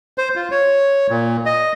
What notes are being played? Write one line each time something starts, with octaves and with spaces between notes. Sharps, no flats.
C5
F4
C#5
A#2
D#5